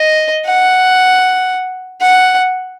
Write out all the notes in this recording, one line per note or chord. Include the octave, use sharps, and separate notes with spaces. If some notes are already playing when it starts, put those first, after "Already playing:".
Already playing: D#5
F#5
F#5